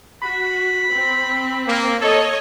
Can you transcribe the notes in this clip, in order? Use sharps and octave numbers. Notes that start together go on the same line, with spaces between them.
F#4 B5
C4
A#3
A4 C#5 D#5